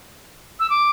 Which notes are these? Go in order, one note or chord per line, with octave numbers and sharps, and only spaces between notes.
E6
D6